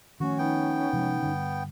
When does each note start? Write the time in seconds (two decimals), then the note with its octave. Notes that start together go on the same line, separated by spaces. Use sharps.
0.20 D#3 F3 A3 C#4 F#4
0.38 B3 D#4 G5
0.93 C3 F3 G#3
1.22 G2 D3